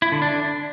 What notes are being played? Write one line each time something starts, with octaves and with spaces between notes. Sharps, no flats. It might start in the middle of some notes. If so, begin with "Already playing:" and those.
E4
D3
D4